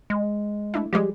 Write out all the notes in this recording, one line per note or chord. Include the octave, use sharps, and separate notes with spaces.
G#3
A3 D4 E4
F3 G3 G#3 G4